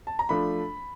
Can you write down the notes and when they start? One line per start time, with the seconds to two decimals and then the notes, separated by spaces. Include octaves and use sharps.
0.07 A5
0.19 A#5
0.29 F3 A3 D4 B5